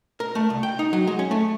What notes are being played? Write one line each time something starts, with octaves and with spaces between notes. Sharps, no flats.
A#4
A3
C2
G5
D#4
F#3
G#3
C#4
A3